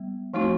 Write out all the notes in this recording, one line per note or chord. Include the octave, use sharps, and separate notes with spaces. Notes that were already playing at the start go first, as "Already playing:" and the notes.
Already playing: G3 B3
F3 A3 C4 D#4 F#4